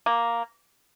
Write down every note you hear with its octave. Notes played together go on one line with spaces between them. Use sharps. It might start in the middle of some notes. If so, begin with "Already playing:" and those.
A#3